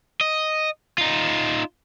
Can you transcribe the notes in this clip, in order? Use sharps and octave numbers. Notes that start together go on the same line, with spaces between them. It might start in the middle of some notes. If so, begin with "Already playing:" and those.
D#5
D#4 F4